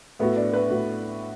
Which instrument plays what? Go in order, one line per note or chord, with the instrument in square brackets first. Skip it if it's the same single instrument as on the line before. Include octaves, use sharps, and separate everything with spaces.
[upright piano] A2 A3 F#4 [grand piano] B3
[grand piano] D4
B4
[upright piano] A2 A3 F#4